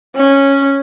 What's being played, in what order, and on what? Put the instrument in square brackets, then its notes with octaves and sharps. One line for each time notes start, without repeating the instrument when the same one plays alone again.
[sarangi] C#4